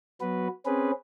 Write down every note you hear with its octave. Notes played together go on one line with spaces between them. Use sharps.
F#3 B3 F#4 B4
C4 C#4 G#4 B4